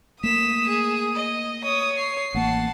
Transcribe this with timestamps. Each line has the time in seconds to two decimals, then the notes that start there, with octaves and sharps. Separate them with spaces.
0.23 A3 A#3 D#6 B6 E7
0.67 G#4
1.15 D#5
1.64 C#5 D#6
1.97 C7
2.34 A1 A#3 F#5 A5